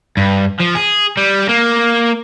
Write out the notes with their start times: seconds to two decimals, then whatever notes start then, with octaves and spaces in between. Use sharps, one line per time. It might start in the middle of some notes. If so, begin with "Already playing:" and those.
0.17 G2
0.60 F3
0.75 G#4
1.17 G3
1.49 A#3